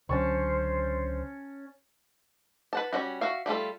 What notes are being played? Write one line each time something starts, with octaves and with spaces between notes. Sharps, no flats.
C#2 D3 F#3 C#4 C5 A5 C#6
B4 F#5 A5
G3 C#4 E4 F#4
F#4 E5 F5
G3 A3 F4 A4